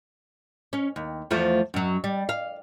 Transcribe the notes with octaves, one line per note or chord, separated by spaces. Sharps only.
C#4
D#2
E2 F3 A3
F#2 F#3
G3
F5